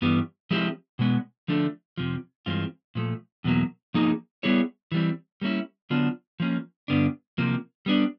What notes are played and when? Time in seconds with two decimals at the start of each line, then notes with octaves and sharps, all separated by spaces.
0.02 G2 E3 G3 B3
0.51 F3 G#3 C4 E4 G4
0.99 B2 G#3 B3
1.48 D3 F3 A3 D4
1.98 F2 C3 F3
2.46 G2 E3 G#3 C4 F4
2.95 A#2 F3 A3
3.44 E2 B2 F#3 A#3
3.94 F3 A#3 D#4 G#4
4.43 G3 B3 E4 G#4 C#5
4.92 E3 G3 C4
5.42 G3 A#3 C#4 E4
5.90 D3 F#3 B3 D4 F4
6.40 F3 A#3 C#4
6.88 G2 D3 G3 B3 D4
7.38 C3 F3 A#3
7.86 G3 B3 D4